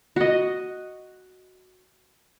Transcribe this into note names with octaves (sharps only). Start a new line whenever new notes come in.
F#4 D#5